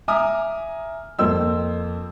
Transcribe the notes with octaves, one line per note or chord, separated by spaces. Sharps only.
E5 G#5 A#5 D6 D#6 F6
F2 A#3 C5 E6